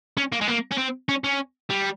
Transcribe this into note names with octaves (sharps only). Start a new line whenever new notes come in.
C#4
A#3
G#3
A#3
C#4
C4
C#4
C#4
G3